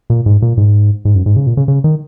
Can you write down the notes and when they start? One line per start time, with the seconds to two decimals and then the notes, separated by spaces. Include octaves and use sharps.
0.10 A#2
0.26 G#2
0.42 A#2
0.57 G#2
1.05 G#2
1.15 F#2
1.26 G#2
1.36 C#3
1.47 A#2
1.57 C#3
1.68 C#3
1.84 D#3